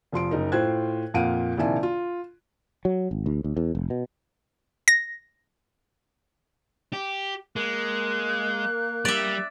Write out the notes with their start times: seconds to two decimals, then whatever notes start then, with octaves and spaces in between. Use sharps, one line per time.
0.12 F1 F3 C6 D7
0.31 F#1 D#4 A#4
0.52 A2 F4 C5 G5 F#6 G#6
1.14 F2 A#2 F5 F#5 D7 D#7
1.58 A#1 C3 D#3 E4 G#5 A5
1.83 F4
2.85 F#3
3.11 G#1
3.26 D2
3.44 D2
3.57 E2
3.75 F1
3.90 B2
4.88 A#6
6.93 G4
7.56 G#3 A#3 F#6
9.05 G3 D5 E5